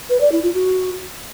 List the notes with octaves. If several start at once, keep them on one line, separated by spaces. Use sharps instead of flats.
B4
D5
E4
F4
F#4